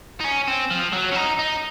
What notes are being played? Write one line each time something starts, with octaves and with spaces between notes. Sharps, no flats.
D#4
C#4
C4
F3
F#3
C#4
D#4
D#4